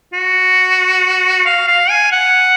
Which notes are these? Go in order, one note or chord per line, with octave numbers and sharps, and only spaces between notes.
F#4
F5
F5
G#5
F#5